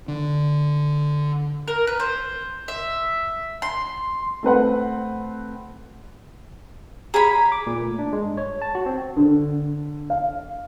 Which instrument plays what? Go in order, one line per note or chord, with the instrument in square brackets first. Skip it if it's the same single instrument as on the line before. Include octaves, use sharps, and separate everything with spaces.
[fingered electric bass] D3
[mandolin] A#4
B4
C5
E5
C6
[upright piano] A3 C4 B4 F#5
[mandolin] G#4 C#5 B5 [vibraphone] A#5
[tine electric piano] D6
A#2
A3
D4
G#3
G2
C#5
A5
F#4
C4
[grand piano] D3
F5